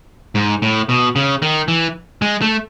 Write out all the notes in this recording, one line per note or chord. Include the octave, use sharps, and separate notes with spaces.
G#2
A2
B2
C#3
D#3
E3
G#3
A3